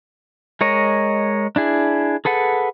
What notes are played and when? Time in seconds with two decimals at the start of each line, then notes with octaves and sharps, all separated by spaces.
0.61 G#3 A#4 C#5 D#5
1.56 D4 E4 G#4
2.25 G#4 A4 B4 F#5